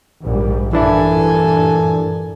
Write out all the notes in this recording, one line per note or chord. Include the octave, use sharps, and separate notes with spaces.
A#1 G#2 G3
G2 A#2 E3 D4 E4 A4 G#5